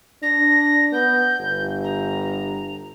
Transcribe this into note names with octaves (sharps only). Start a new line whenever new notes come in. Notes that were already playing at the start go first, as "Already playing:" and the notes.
D4 A#6
B3 G6
G1
A#5